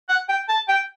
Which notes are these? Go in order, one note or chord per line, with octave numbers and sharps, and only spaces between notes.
F#5
G5
A5
G5